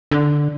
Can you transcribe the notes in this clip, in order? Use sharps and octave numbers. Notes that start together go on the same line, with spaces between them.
D3